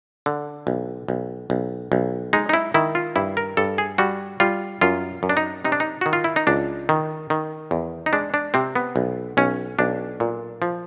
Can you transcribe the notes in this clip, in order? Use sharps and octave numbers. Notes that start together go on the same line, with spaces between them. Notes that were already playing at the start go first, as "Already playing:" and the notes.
D3
B1
B1
B1
B1
G#3 D#4
D#4
E4
D#3 E4
F4
G2 E4
A#4
G2 A4
G#4
G3 F#4
G3 F4
F#2 F4
F#2
D4
D#4
C3 D#4
D4
D#4
D#3 F#4
F4
E4
D#4
C#2 D4
D#3
D#3
E2
D#4
G#3 D4
D4
C3 C4
B3
B1
B1 C#4
B1 D4
A#2
F3